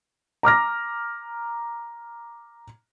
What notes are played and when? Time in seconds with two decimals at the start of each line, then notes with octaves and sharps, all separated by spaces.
0.43 A#5 D6 F6 A#6